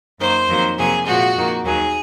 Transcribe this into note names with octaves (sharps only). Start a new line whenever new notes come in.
F#2 D#3 A#3 C5
F2 D#3 F#3 A#3
F2 C3 F#3 A#3 G#4
A#2 F3 G#3 F#4
F2 D#3 A#3
D#2 D#3 F#3 A#3 G#4